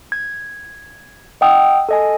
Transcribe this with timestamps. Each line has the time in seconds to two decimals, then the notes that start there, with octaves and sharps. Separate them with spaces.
0.12 G#6
1.41 D#5 F#5 G5 D#6 E6
1.89 A4 D#5 G#5